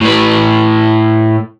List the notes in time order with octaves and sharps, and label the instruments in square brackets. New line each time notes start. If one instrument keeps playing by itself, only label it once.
[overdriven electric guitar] A2 B4